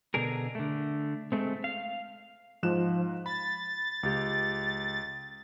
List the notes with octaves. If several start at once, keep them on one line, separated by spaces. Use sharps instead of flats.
B2 D3 D4 G#4 A#4
D3 A3
G#3 A3 C4
F5
G#2 F3 F#6 E7
B5 A6
C#2 G4